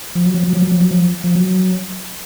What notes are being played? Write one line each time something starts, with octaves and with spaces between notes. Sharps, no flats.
F3
F#3
F3
F#3
F3
F#3
F3
F#3
F3
F3
F#3